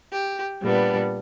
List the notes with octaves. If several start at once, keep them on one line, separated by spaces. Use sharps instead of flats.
G4
A#2 G3 B3 D4